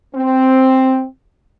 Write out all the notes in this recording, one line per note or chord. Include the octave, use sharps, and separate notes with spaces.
C4